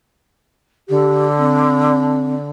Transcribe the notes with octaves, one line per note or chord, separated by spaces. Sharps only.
D3 G4
C4